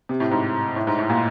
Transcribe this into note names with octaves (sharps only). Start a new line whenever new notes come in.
C3
A2
G#2
A2
G#2
A2
A#2